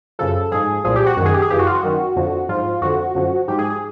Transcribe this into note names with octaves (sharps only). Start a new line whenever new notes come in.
F#2 C#3 F3 A4
G#2 F3 G#4
C2 A#2 F3 G#4
G4
F#4
F#2 D#3 F#4
G#4
G4
G#4
F#2 C#3 E3 G4
F#4
F4
F#4
F#2 D#3
F2 D3 F3
G#2 F3 F4
F2 D3 F3 F#4
F#2 D3 F3
G#2 F3 G4
G#4
G#4